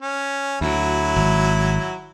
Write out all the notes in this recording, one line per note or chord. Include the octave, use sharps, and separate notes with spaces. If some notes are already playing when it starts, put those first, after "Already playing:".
C#4
D2 F#3 E4
G#1